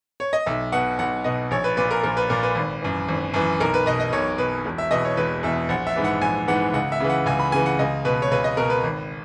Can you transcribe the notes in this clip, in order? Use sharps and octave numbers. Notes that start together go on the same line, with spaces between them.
C#5
D#5
B1 E5
B2 F#5
B1 F#5
B2 D#5
A#1 C#5
B4
A#2 B4
A#4
A#1 A#4
B4
A#2 A#4
B4
G#1
F#2 E3
G#1
F#2 E3
B1 A#4
B4
B2 D#5
D#5
B1 C#5
B2 B4
E1
E5
E2 B2 D#5
C#5
E1 B4
E2 B2 E5
A#1 F#5
E5
G#2 E3
F#5
A#1 G#5
G#2 E3 F#5
C#2 F#5
E5
C#3 E3
F#5
C#2 G#5
B5
C#3 E3 G#5
F#5
C#2 D#5
B2 B4
C#5
C#2 B4
D#5
B2 A#4
B4
G#1